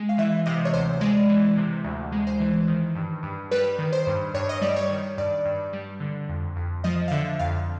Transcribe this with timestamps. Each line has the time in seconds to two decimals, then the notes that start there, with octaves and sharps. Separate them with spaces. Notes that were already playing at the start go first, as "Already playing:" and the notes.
Already playing: G#3
0.09 F5
0.18 E3 E5
0.46 C3 D#5
0.65 C#5
0.73 D2 C5
1.01 G#3 D5
1.29 E3
1.57 C3
1.84 D2
2.12 G#3
2.27 C5
2.40 E3
2.68 D#3
2.95 G2
3.23 G2
3.51 G3 B4
3.79 D#3
3.92 C5
4.07 G2
4.34 G2 C#5
4.49 D#5
4.61 G3 D5
4.76 C#5
4.89 D#3
5.18 G2 D5
5.45 G2
5.73 G3
6.00 D3
6.29 F2
6.56 F2
6.84 F3 D#5
7.08 F5
7.11 D3 E5
7.39 F2 F5